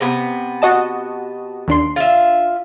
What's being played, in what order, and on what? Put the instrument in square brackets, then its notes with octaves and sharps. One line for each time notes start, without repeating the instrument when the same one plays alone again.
[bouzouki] C3 B3
[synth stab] F#4 D#5 A5
D#2 D4 C6
[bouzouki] F4 E5